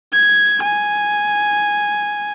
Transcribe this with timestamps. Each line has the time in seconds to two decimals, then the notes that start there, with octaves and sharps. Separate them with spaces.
0.13 G#6
0.63 G#5